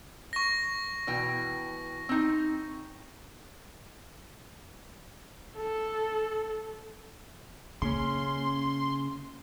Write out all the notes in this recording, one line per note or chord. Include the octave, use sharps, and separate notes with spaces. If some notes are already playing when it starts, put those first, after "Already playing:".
C#6 A#6
B2 E3 G5
C4 D#4
A4
C#3 A#3 C#4 C6